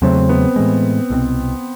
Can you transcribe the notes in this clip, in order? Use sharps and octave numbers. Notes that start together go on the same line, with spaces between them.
E2 C#3 F#3 A3 C4
B3
A2 E3 G#3
C2 B2 G3 C4